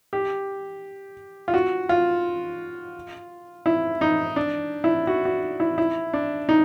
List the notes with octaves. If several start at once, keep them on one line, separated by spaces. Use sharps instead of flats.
G4
F4
F#4
F4
E4
D#4
D4
E4
F#4
F#4
E4
E4
D4
D#4